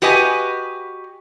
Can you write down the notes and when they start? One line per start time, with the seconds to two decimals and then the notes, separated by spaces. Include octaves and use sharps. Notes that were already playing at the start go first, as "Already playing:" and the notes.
0.02 F#4 G4 B4 D#5 G#5